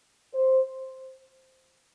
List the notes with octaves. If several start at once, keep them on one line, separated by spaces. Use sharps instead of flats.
C5